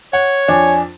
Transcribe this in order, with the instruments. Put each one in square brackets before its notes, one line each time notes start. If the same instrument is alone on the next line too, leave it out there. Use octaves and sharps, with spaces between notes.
[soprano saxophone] C#5 [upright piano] F#5
[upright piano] F2 D4 [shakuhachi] G#5